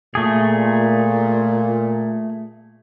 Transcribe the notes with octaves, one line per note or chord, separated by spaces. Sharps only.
A#2 A3 G#4